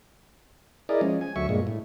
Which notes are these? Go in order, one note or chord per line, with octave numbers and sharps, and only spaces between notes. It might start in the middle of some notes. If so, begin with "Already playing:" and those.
E4 G#4 A#4 D5 D#5
F3 G#3 C#4
G#5
D2 F#3 E5 C#6
G2 A#2 G#3
A2